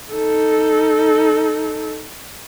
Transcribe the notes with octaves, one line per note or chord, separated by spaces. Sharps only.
D#4 A4